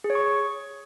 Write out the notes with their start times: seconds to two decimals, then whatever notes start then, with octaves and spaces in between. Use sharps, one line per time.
0.04 G#4
0.10 C#5
0.15 C#6